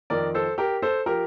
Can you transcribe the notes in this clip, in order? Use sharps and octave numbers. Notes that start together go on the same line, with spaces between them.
F2 D#3 A#4 D5
A4 C5
G4 A#4
A4 C5
F3 G4 A#4